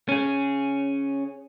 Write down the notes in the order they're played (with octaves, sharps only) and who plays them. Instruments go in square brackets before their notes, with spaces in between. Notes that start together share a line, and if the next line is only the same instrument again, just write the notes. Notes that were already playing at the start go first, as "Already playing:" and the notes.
[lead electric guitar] C#4 G#4